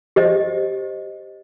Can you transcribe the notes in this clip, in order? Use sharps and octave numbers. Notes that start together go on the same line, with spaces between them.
G4 C5 D#5